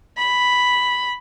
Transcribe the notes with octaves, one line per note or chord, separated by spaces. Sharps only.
B5